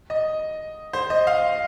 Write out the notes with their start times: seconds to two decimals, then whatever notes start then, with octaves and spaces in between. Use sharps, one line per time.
0.10 D#5
0.93 C5
1.10 D#5
1.27 F5